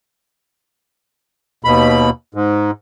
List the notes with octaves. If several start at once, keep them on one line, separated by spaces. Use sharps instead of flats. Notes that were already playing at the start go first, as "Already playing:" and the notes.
D#2 B2 B5
G#2